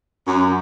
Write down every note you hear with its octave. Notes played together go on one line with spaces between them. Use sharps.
F#2